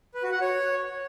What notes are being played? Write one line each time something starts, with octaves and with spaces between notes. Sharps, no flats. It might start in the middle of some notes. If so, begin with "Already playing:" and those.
B4
F#4
F#5
C#5